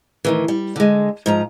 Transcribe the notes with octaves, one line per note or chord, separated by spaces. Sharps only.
A2 D#3 E3
G3
D3 G#3
G#2 F3 A#5